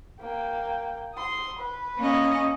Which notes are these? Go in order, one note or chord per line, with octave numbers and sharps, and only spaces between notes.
A#3 G5
C6 D#6
B4
A#3 C#4 D#5